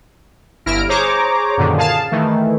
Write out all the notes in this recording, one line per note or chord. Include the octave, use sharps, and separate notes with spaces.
G1 E4 F6 A#6 D7
G#4 C5 C#5 A#5 D6
F#2 A#2 D3 D#3
G#4 F5 A5
D#3 E3 A3